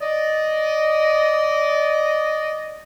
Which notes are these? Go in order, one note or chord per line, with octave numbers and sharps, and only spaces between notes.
D5 D#5